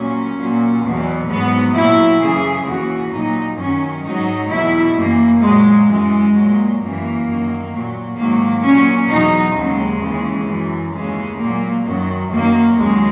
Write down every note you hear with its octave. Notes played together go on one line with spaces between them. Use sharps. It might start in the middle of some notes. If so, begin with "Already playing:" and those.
Already playing: A#2 F#3 C#4
A#2 F#3
E2 B2 F#3
G#2 F#3 B3
A#2 F#3 E4
F#2 C#3 E3 G#4
D#2 C#3 E3 F#4
A#2 F#3 D#4
F#2 D#3 F#3 C#4
G#2 F#3 D#4
E2 B2 F#3 E4
F#2 E3 A#3
A#2 F#3 G#3
F#2 E3 G#3
A#2 F#3
F#2 E3 A#3
F#2 D#3 F#3
A#2 F#3
G#2 D#3 F#3 A#3
A#2 F#3 C#4
E2 B2 F#3 D#4
D#2 C#3 F#3 G#3
D#2 C#3 E3
F#2 E3
D#2 C#3 E3 G#3
A#2 F#3 A#3
F#2 D#3 F#3
F#2 D#3 F#3 A#3
D#2 C#3 F#3 G#3